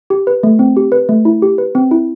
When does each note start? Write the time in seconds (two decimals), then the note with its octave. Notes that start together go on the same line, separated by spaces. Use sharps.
0.10 G4
0.27 B4
0.43 A3
0.59 C4
0.77 G4
0.92 B4
1.09 A3
1.25 E4
1.42 G4
1.58 B4
1.75 C4
1.91 E4